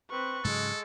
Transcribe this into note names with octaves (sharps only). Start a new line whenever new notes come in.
C4 B4 C#6 F#6
G#2 C#3 F#3 G#3 A4